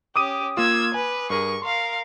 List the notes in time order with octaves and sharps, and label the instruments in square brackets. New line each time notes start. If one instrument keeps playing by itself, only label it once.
[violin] C#4 G4 [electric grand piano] D6 D#6 D#7
[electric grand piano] A#3 F4 [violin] E6 G#6
[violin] B4 [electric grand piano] G#5
[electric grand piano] G2 A#4 [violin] G#4 C#6
[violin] A#4 F5 [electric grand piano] C6